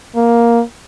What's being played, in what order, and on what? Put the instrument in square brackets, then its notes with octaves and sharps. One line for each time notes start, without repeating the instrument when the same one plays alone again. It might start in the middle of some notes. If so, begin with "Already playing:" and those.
[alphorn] A#3